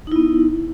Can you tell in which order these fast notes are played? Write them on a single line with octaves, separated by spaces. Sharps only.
D#4 E4 B3